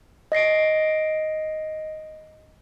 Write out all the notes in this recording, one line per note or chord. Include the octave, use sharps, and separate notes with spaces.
D#5 A#6 C7 D7